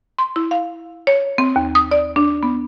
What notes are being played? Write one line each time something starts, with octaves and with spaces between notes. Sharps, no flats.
C6
E4
F5
C#5
C4
D#2
D#6
D5
D4
B3